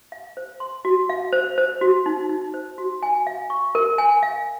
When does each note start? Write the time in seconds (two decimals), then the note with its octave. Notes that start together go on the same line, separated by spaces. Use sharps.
0.12 F5
0.37 C5
0.60 C6
0.85 F#4
1.09 F5
1.33 C5
1.58 C5
1.81 F#4
2.06 D#4
2.30 D#4
2.54 C5
2.78 F#4
3.03 G#5
3.27 F5
3.50 C#6
3.75 A#4
3.98 G#5
4.23 F5